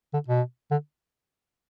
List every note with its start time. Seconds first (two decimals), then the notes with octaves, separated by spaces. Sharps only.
0.13 D3
0.28 B2
0.71 D3